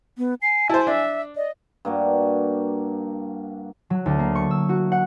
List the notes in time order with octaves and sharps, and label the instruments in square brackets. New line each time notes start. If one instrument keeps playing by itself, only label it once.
[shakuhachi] B3
[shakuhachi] G#5 [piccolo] C7
[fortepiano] E4 C5 [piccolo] A5
[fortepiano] D4 [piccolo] E5
[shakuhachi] D5 [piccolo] D#5
[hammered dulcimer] G2 A#3 F#4
[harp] F#3
D2
A#3
C#6
E6
F#4
F#5